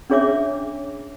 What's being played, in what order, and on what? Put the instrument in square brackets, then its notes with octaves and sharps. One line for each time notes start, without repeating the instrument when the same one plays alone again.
[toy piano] C#4 D4 G#4 C#5 E5 D6